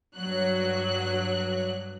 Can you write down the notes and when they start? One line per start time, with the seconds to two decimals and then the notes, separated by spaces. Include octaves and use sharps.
0.17 G2 F#3 C#5 F#6